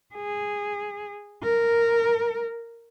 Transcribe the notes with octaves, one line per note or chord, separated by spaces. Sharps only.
G#4
A#4